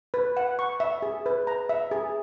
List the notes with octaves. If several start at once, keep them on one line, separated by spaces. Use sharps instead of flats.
B4
F#5
C#6
E5
G#4
B4
A#5
E5
G#4